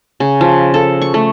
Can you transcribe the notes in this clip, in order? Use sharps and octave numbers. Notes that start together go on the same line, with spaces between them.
C#3
F3
A4
C#6
A3